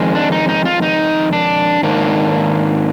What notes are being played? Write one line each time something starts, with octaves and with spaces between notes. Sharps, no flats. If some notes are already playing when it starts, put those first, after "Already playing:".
Already playing: F2 D#3 G#3
D4
D#4
D#4
F4
D#4
D4
G#2 D#3 A#3 D4